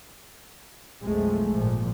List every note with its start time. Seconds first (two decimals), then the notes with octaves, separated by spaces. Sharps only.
1.02 B1 F2 F3 G#3 A3
1.53 G#1 A#2 F3